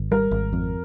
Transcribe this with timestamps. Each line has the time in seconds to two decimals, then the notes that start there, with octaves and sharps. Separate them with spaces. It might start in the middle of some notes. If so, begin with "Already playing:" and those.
Already playing: G#1
0.11 G3 A#4
0.31 G#1
0.53 F2